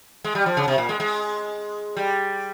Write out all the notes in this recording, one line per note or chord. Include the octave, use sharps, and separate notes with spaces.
G#3
G3
F3
C#3
C3
A#2
G#3
G#3
G3